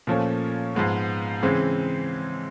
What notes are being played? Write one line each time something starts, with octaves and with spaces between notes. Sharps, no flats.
A#2 F3 A3 C#4
G#2 F3 G#3 B3
C#3 E3 G#3 C4